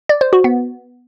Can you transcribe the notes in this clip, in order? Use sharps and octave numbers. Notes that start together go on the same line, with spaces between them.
D5
C5
F#4
B3